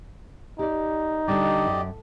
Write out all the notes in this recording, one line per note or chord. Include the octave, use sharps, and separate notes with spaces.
D#4 G4 D5
D3 G3 G4 D5 D#5
F#2